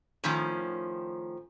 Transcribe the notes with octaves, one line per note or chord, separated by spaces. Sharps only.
A2 D#3 F3 C#4